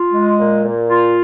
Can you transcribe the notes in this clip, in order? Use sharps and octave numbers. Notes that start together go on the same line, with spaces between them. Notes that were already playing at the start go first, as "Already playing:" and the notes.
Already playing: F4
G#3
A#2
A#2
F4